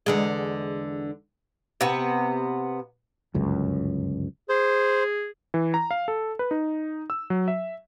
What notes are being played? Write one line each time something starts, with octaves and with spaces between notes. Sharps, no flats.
E2 D3 G#3
C3 B3
G1 C#2 F#2
G#4 C5
E3
A#5
F5
A4
B4
D#4
E6
F#3
E5